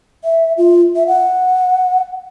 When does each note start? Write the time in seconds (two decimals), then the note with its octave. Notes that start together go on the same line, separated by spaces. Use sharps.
0.24 E5
0.58 F4
0.96 E5
1.07 F#5